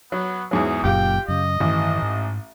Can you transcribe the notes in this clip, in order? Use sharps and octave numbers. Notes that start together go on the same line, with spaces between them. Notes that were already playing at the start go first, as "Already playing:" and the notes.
F#3 B3
E2 G#2 F#3 G#4
F#1 F#2 A#2 F4 G4 G5 D6
F#2 C#3 D#5
A1 G2 D#3 E3
G#2